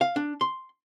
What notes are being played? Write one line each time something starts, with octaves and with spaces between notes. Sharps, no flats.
F5
D4
C6